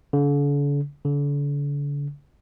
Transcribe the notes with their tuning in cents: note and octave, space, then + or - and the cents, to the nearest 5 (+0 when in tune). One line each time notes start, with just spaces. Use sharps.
D3 -45
D3 -40